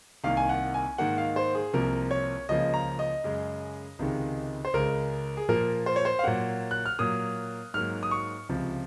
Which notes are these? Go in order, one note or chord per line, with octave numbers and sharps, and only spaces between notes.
C2 C3 D#3 A#3 F5
G#5
F#5
G#5
G#2 D#3 A#3 F#5
F5
C5
G#4
C2 C3 F3 A#3 A#4
C#5
C#2 C#3 F3 A#3 D#5
A#5
D#5
F#2 C#3 G#3
C#2 C3 D#3 G#3
C5
C#2 C#3 G#3 A#4
G#4
A#2 F3 A#3 A#4
C5
C#5
C5
F5
A#2 F#3 A#3 F#5
F#6
F6
A#2 F#3 A#3 D#6
G#2 F#3 A#3 F6
D#6
C#6
C#2 C3 F3